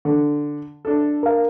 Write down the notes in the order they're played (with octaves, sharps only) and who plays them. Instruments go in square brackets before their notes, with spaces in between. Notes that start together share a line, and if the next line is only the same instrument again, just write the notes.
[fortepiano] D3
D4 A4
[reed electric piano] A#4 F5